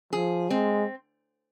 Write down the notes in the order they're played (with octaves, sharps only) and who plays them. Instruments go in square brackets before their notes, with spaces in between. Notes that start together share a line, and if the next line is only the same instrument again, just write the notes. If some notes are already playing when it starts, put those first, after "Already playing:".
[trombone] F3 [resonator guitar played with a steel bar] G#4
[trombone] G#3 [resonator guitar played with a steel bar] C4